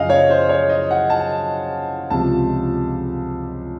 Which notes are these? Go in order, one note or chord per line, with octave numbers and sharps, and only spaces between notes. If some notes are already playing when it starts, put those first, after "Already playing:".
Already playing: F#2 C#3 F3 D#5 F5
C#5
C5
C#5
D#5
F#5
A5
C#2 C3 F3 A5